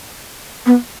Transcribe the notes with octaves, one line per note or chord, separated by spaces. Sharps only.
B3